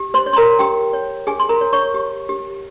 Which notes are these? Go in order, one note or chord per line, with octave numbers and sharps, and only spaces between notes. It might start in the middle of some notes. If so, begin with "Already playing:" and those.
Already playing: G4
C5 C6
C#5
C6
A#4 A#5
G4 G5
C#5
G4 G#4 G#5
C6
A#4 A#5
C#5
C#5 C#6
G4
G4